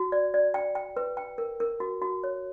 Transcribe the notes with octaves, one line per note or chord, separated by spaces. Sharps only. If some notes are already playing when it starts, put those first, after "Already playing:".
Already playing: F#4
D5
D5
G5
G5
B4
G5
A#4
A#4
F#4
F#4
C#5